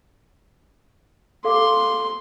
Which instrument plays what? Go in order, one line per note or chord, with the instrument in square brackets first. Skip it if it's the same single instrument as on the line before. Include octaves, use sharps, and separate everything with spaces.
[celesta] A4 F5 D6 [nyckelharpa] C6